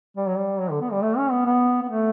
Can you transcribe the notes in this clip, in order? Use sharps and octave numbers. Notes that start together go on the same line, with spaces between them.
G3
F#3
G3
F#3
D3
B3
G3
A3
C#4
B3
B3
B3
A3